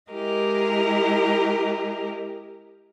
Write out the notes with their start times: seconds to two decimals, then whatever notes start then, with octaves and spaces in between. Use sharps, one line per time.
0.10 G#3 E4 G4 A#4 D#5